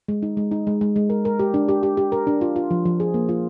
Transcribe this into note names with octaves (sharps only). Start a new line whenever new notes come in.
G#3
D#4
G#3
D#4
G#3
G#3
G#3
A#4
A#4
G4
D4
G4
G4
G4
A#4
D4
F4
F4
F3
F3
G#4
A#3
F4